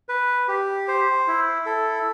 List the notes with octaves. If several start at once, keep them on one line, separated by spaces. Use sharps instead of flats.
B4
G4
C5
E4
A4